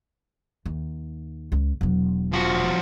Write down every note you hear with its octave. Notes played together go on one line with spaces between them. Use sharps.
D#2
C#2
E1 F#3
F3 F#4